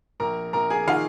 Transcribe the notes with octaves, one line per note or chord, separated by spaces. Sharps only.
A#1 A#4 A#5
A#1 A#4 A#5
G#4 G#5
D#3 F4 F5